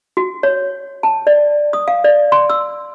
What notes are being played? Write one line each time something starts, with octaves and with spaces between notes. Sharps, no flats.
F#4
C#5
A5
D5
D#6
F5
D5
C6
E6